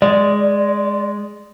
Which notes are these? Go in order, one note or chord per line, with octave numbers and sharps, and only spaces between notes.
G#3 D5